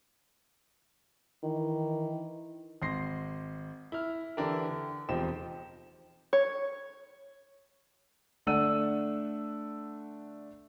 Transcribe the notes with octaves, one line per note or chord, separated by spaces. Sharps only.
D#3 E3
G#1 C6 A#6 C7
E4 F6
D3 E3 D4 E4 G4 A#4
D3
E1 F3 C4 D#4 G4 E7
C#5
D3 A3 D4 F#5 E6 D#7